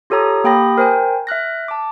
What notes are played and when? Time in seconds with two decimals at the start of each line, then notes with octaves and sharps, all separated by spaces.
0.10 F4 G4 A4 C#5 A#5 D#6
0.44 A#3 G4 G5 B5 D#6 A#6
0.78 A#4 C5 G5 G#5
1.27 E5 F6 F#6 A#6
1.68 A5 D6